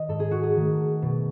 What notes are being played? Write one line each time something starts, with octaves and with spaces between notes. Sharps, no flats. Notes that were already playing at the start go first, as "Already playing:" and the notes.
Already playing: D#3 D#5
G#2 A4
G#4
F#4
G#4
D#3 A3
B2